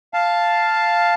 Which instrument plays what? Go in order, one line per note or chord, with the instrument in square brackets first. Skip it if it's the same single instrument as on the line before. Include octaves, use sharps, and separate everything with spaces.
[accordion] F5 A5